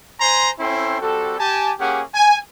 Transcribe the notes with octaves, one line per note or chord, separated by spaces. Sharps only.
C5 G#5 A#5 C6
C4 C#4 E4 A4 G5 C6
G3 C4 F#4 A4
G4 G#5 A5
A#3 C#4 G4 G#4 F#5
G#5